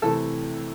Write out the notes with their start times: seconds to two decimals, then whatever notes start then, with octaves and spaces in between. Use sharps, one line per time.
0.02 C3 E3 A3 A4